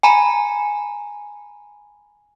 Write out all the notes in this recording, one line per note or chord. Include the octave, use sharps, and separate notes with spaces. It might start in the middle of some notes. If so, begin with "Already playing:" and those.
G#5 A#5 B5